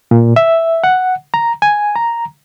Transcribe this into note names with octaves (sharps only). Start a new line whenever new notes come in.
A#2
E5
F#5
A#5
G#5
A#5